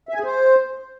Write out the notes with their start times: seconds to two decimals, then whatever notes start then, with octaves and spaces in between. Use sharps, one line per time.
0.09 E5
0.14 G#5
0.19 G#4
0.24 C5